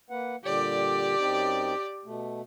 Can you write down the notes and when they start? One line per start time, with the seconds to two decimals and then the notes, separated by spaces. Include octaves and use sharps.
0.10 A#3 B4 F#5
0.44 A#2 D3 G3 G4 D5
1.19 F#2 C4 D#4
2.05 B2 A3